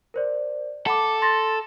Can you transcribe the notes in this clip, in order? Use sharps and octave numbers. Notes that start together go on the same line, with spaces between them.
A#4 C5 D5
A4 F#5 B5 D6
C6 A6 A#6